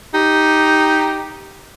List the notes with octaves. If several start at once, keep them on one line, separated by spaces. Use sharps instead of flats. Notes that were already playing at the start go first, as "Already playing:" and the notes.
D#4 G4